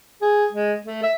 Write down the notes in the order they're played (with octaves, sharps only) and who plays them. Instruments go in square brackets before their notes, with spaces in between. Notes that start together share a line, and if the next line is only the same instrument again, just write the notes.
[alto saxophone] G#4
G#3
A3
E5